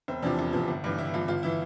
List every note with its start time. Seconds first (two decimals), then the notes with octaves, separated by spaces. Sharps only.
0.08 E1 C4
0.23 E2 C3 F3 D4
0.39 E1
0.53 E2 C3 F3
0.68 G1
0.84 G2 E3
0.98 G1 E4
1.13 G2 E3 F4
1.28 G1 F4
1.43 E3 E4